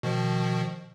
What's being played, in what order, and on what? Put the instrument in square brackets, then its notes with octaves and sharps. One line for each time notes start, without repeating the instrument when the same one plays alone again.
[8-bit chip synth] B2 D#3 F3